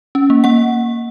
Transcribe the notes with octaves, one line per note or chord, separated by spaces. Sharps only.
C#4
A#3
A#3 F#5